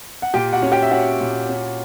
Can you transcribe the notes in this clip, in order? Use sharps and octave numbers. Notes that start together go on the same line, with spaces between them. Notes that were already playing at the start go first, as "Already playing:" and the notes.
F#5
A#2 G4 G5
F#4 F#5
C#4
G4 G5
E5
C#4 F#4 F#5
A#2
C#4